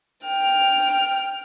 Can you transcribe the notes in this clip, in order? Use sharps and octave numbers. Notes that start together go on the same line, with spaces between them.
G5 F6